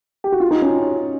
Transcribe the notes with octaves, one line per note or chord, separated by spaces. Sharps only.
G4
F#4
F4
D#4
C#4